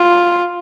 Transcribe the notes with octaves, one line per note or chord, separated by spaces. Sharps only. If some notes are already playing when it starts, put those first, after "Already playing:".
Already playing: F4